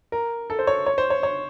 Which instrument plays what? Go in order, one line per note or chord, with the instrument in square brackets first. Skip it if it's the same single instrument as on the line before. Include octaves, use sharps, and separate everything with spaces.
[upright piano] A#4
A4
C5
C#5
C#5
C5
C#5
C#5